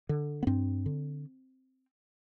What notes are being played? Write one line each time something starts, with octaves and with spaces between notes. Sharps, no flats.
D3
B3
G2 C4
D3